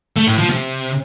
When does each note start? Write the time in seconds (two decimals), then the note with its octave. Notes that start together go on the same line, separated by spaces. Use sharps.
0.16 A3
0.27 A2
0.38 F3
0.49 C3